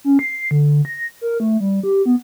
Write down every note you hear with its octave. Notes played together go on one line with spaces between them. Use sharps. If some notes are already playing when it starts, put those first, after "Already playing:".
C#4
C7
D3
A#6
A#4
A3
G3
G4
B3